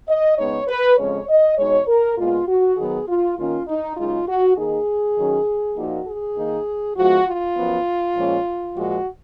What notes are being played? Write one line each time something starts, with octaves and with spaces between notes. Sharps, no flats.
D#5
C#3 G#3 B3 D#4 C#5
B4
F2 C#3 G#3 C#4 C#5
D#5
B2 G#3 D#4 C#5
A#4
A#2 G#3 B3 F4
F#4
D#3 F#3 B3 G#4
F4
D#3 A#3 C#4 F4
D#4
F#2 C#3 G#3 D#4 F4
F#4
D#3 A#3 D#4 G#4
D#3 F#3 C#4
A#2 F3 A#3 D#4 F#4
G#4
D#3 A#3 D#4
G#2 F3 G#3 B3 F#4
F4
F#2 F3 B3
A#2 F3 G#3 C#4
A#2 F3 G#3 F#4